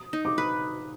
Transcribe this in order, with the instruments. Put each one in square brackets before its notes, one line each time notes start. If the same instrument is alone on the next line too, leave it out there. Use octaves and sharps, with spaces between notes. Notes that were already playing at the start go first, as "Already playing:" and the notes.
Already playing: [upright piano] D#6
[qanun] D#4
[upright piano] D6
[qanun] B4